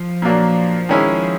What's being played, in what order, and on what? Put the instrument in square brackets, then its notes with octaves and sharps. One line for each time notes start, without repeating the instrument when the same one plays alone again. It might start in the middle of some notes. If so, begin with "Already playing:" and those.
Already playing: [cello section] F3
[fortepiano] A#2 F#3 A#3 D4
D#3 G#3 C#4 E4 G#4